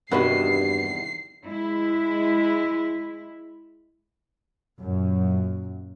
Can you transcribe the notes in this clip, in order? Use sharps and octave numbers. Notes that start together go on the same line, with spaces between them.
E2 G2 C3 D#3 F#4 B4 C7
G#3 E4
F#2 A#2